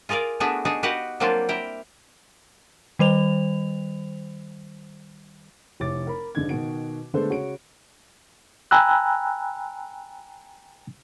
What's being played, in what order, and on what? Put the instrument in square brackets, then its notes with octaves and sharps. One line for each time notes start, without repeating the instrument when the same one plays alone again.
[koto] F4 G#4 A#4 D5 F5
A3 B3 D4 E4 F#4 G#4
D4 D#4 G#4
F#4 G4 B4 D#5 F5 F#5
F#3 G3 A#3 C4 D4 F4
E4 A#4 G5
[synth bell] D#3 G3 C5 F7
[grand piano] F1 E4 C#5 D6 A6
A#4 B5
F#1 D3 D#4 G#6
B2 D#3 F#4 D7
D3 G#3 A3 B3 A4 C5
C#3 F#4 C#5 D7
[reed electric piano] G5 G#5 A#5 B5 E6 F#6